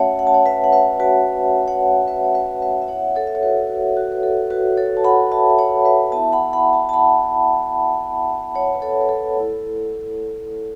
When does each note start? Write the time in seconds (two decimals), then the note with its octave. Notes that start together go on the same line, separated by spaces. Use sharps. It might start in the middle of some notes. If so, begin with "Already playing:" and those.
Already playing: A3 C#4 F#4 C#5 E5 F#5 A5
0.19 F#5
0.27 A5
0.34 C#5 F#5
0.46 B4 E5
0.64 F#5
0.72 B4 E5
0.99 F#4 B4
1.68 C#5 F#5
2.08 B4 E5
2.24 C#5
2.35 B4 E5
2.62 B4 E5
2.82 E5
2.88 B3 E4 C#5 F#5
3.16 A4 C#5
3.27 E5
3.35 C#5
3.43 F#4 B4
3.70 F#4
3.97 F#4
4.12 B4
4.23 A4
4.50 F#4 B4
4.77 A4 C#5
4.97 A5
5.04 F#5 B5
5.31 E5 A5
5.50 E5
5.59 C#5 F#5
5.85 B4 E5
6.12 B3 E4 E5 A5
6.33 F#5 B5
6.53 F#5 B5
6.73 E5 A5
6.89 A5
6.93 F#5 B5
8.55 C#5 F#5
8.74 B4
8.82 A4 C#5
9.01 B4
9.09 A4
9.36 A3 E4